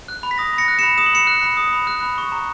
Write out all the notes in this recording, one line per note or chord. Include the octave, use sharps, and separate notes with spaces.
F#6
B5
B6
D#6 A#6
B5 A#6 C#7
F#6
B5 C#7 E7
D#6 E7
F#7
B5 C#7 E7
F#6
B5
D#6
B5
F#6
B5
C#6
A#5